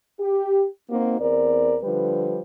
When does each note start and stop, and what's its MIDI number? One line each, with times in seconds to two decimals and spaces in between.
0.20 0.66 67
0.90 1.17 58
0.90 1.17 60
0.90 1.17 63
0.90 1.17 66
1.20 1.77 40
1.20 1.77 60
1.20 1.77 70
1.20 1.77 74
1.82 2.40 50
1.82 2.40 53
1.82 2.40 55
1.82 2.40 71